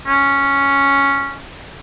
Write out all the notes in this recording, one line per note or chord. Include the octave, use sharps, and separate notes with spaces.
C#4